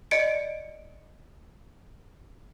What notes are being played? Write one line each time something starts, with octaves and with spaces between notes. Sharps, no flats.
D5 D#5 C#7 D7